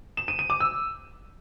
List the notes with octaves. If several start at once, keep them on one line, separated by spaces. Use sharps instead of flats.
E7
D#7
D#7
D6
E6